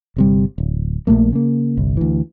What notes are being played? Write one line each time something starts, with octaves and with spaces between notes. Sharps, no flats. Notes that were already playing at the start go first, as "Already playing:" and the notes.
G1 C3 G3
D1
A#1 A2 A3 A#3
C#3 A#3
G1 C2
D2 E3